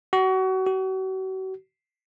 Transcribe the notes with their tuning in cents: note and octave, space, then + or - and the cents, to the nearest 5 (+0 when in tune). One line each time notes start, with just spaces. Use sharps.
F#4 +30
F#4 +40